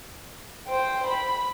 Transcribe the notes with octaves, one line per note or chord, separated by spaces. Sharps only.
C5 G5
B5